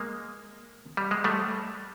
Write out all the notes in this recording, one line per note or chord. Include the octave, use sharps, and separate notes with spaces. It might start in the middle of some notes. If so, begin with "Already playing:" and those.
Already playing: G#3 A#3
G3
G#3
G3 A3